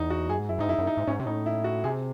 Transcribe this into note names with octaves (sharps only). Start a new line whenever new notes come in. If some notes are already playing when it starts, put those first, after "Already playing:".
Already playing: E2 D#4
F#4
F#2 G#4
G#2
F#2 E4
G#2 D#4
F#2 E4
F#2
D#4
G#2
G#2 C#4
C3
A2 D#4
E4
F#4
C3 G#4